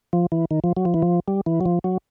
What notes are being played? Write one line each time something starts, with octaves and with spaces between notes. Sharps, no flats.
F3
E3
D#3
F3
F#3
F3
E3
F3
G3
E3
F#3
F3
F#3